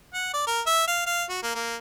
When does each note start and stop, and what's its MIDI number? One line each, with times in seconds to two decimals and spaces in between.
0.14 0.29 78
0.34 0.42 74
0.47 0.61 70
0.66 0.86 76
0.87 1.06 77
1.07 1.24 77
1.29 1.38 66
1.43 1.54 58
1.55 1.76 58